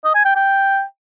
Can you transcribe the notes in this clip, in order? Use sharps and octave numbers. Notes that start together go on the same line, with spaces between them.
D#5
G#5
G5
G5